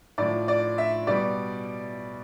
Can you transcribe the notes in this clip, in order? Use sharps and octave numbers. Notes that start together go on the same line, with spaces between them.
A2 F3 D5
D5
E5
B2 G3 D5